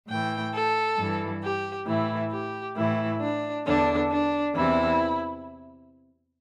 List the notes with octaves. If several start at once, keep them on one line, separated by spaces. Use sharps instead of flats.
A2 E3 G5
A4
G2 E3
G4
A2 E3 E4
G4
A2 E3 E4
D4
E2 D3 D4
D4
E2 C3 E3 E4